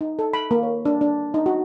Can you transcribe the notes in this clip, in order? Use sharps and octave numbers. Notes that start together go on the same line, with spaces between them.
D#4
A4
B5
A#3
C#5
D4
D4
D#4
F#4